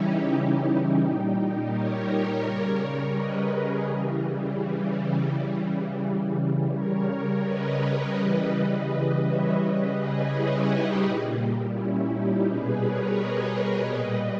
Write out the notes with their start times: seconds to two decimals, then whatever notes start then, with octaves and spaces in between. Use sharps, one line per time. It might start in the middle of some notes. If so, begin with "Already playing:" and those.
Already playing: C#3 E3 G3 C#4 D#4 E4 G4
0.27 D#4 G4
0.99 A#2 G3
1.71 A#4 C#5
2.42 C#3 G3
3.15 B4 D#5
3.50 G#4 B4
3.85 C#3 E3 G3
5.29 C#3 E3 G3
6.72 C#3 G3 A#4 C#5
7.43 B4 D#5
8.15 C#3 E3 G3
8.87 B4 D#5
9.23 C#5 E5
9.58 C#3 G3 B4 D#5
9.94 G#4 B4
10.30 C#4 E4
10.66 D#4 G4
11.02 A#2 G3
11.74 C#4 E4
12.10 D#4 G4
12.45 B2 G3 G#4 B4
12.81 A#4 C#5
13.17 B4 D#5
13.89 A#2 G3